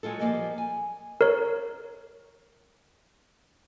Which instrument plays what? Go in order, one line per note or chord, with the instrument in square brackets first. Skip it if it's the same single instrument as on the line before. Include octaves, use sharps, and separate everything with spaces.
[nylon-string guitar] F#3 G#3 F4 A4
F3 G3 A#3 G#4 D#5
G#5
[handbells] A#4 C#5